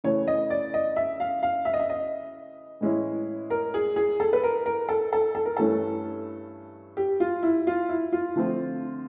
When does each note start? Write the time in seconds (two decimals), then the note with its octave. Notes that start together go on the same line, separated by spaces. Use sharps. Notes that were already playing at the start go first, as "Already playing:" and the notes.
0.04 C#3 E3 A3 C#5
0.28 D#5
0.50 D5
0.74 D#5
0.96 E5
1.20 F5
1.43 F5
1.65 E5
1.74 D#5
1.79 E5
1.90 D#5
2.81 A2 E3 G#3 C#4 E4
3.50 A#4
3.74 G#4
3.96 G#4
4.20 A4
4.33 B4
4.44 A#4
4.66 A#4
4.89 A4
5.13 A4
5.35 A4
5.45 A#4
5.57 G2 E3 A3 C#4 A4
6.97 G4
7.20 F4
7.43 E4
7.67 F4
7.89 E4
8.13 F4
8.36 D3 F3 A3 C4